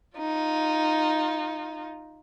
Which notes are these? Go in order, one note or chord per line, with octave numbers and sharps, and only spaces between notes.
D#4 F4